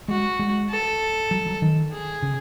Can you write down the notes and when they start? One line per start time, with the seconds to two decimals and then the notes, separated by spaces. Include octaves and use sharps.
0.08 G#3 F#4
0.39 G#3
0.70 A4
1.31 F#3
1.46 F#3
1.62 D#3
1.92 G#4
2.22 C#3